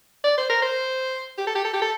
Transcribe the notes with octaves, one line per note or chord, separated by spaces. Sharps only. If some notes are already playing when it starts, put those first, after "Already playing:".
D5
C5
A#4
C5
G4
A4
G4
A4
G4
A4